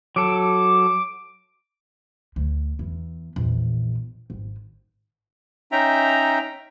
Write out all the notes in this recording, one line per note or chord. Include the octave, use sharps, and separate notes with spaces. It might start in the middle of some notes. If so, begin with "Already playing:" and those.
F#3 A4 D6
D2
E2
A#1 E2
G#1
C#4 D#4 E5 G5 A#5